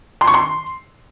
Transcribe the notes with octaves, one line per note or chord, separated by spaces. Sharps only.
C6
C#6
C6